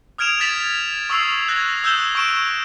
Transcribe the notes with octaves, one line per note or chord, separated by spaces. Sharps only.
D#6 F6 G#6 D7 E7 F7
D#6 G#6 A6 B6 E7 F#7
C#6 D#6 E6 G#6 C7
F#6 G#6 A#6
D#6 E6 F#6 G6 E7 G7
C#6 D7 E7